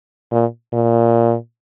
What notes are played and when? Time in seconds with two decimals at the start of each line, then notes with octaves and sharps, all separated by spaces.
0.32 A#2
0.73 A#2